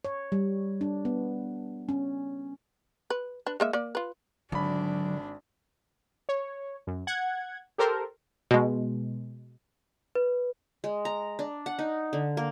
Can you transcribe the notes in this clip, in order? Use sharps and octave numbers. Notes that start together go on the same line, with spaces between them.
C#5
G3
D4
B3
C#4
B4
D4 B4
G#3 A#3 E5
A#3 D5
F4 B4
G#1 D3 F#3 D4 B5
C#5
F#2
F#5 G#6
G4 A4 A#4 C5
B2 G#3
B4
G#3
A#5
D4
F#5
D#4
D3
A#3